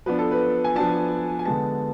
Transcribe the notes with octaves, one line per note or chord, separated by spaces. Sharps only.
F3 B3 D4 B4
A4
B4
G#5
F3 B3 D4 A5
G#5
D3 G#3 B3 A5